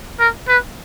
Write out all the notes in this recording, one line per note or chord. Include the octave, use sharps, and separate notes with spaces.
A#4
B4